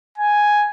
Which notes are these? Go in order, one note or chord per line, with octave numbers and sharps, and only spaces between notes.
G#5